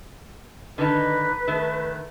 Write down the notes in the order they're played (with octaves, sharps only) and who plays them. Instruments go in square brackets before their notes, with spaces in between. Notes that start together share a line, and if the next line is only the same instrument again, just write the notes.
[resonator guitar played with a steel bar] D3 D#3 D#4 [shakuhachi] B4
[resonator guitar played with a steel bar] D#3 A3